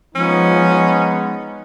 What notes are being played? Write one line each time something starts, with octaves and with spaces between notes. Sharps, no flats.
F3 G#3 B3 C#4 D#4